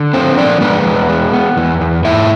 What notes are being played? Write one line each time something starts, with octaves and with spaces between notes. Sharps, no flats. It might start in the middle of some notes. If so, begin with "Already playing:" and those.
Already playing: D3
A3 C4 C5
F3 D4 D5
G#3 B3 B4
E2
G#3
B3
E2
E2
G#2 E4 E5